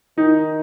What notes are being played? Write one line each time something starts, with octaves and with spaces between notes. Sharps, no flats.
D#3 D#4